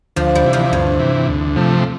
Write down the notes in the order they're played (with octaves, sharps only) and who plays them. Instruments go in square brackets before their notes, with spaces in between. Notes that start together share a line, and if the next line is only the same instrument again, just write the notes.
[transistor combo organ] D2 [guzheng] F3
[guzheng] G3
[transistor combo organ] C3 E3
[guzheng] F3
[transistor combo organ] D2 [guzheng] G2
[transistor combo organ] C3 E3
D2
C3 F3 A3